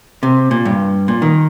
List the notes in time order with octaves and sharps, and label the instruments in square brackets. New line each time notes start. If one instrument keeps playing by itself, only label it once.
[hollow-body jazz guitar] C3
A#2
G2
A#2
D#3